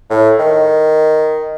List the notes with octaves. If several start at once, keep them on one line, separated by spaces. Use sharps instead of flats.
A2
D#3